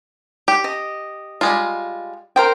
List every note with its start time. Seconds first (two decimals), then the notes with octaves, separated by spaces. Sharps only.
0.48 G4
0.64 D#5
1.41 G3 G#3 F4
2.36 A#4 C5 G5